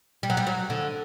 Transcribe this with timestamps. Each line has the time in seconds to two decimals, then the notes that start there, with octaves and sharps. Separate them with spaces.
0.23 G3
0.30 F#3
0.37 G3
0.47 F#3
0.70 D3